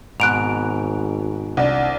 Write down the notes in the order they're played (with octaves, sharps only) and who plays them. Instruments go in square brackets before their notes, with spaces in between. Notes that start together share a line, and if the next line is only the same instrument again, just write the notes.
[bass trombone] G#1 [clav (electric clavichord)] G#2 B2 [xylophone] F#6 D7 F7
[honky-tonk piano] C2 D4